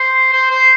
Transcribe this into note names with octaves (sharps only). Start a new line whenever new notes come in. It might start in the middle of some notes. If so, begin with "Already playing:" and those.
Already playing: C5
C5
C5